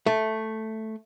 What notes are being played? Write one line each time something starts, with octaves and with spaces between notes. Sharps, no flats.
A3